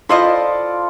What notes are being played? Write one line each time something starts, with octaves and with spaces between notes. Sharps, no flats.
E4 F4 A4 C5 D5 D#5